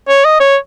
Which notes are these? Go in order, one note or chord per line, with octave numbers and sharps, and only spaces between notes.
C#5
D#5
C#5